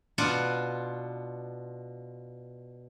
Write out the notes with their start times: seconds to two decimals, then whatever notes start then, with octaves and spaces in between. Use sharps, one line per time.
0.18 B2 D4 F4 B4 F#5